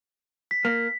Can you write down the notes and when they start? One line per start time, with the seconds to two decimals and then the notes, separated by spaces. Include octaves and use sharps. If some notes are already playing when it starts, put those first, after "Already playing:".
0.51 B6
0.65 A#3